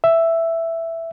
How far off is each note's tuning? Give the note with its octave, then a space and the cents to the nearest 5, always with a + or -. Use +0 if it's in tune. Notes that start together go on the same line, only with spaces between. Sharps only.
E5 +5